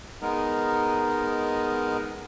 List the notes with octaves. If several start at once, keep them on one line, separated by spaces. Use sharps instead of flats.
G#3 B3 D#4 A#4